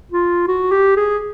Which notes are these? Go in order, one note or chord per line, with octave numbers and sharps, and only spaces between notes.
F4
F#4
G4
G#4